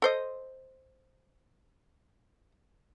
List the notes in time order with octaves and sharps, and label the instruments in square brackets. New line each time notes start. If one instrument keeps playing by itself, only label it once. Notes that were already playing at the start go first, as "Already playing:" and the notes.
[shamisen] A4 C5 D#5